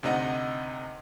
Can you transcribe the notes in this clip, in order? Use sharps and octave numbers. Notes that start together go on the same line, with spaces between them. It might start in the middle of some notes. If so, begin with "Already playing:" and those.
D2 C3 D#4 D#5 F#5